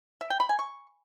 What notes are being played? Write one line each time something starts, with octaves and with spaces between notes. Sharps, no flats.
E5
G5
B5
G#5
C#6